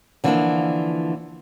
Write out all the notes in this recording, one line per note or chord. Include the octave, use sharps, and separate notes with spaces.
D3 E3 F3 A#3 C4 D4